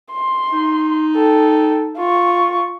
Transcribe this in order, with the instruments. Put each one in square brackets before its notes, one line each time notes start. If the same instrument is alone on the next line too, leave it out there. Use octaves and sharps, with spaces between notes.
[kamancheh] C6
[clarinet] D#4
[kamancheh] A4 G5
F4 C#6